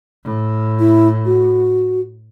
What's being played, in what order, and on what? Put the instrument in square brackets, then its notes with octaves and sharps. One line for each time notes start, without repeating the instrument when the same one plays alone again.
[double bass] A2
[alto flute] E4
F#4